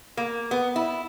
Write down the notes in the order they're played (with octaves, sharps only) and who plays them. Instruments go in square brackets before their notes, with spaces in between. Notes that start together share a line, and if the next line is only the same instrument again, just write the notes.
[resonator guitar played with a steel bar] A#3
B3
E4